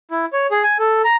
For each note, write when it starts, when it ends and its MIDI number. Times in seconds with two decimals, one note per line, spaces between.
0.11 0.25 64
0.33 0.47 73
0.51 0.63 68
0.63 0.77 80
0.79 1.02 69
1.04 1.16 82